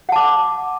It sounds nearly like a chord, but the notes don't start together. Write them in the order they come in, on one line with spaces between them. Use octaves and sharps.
F#5 A5 D6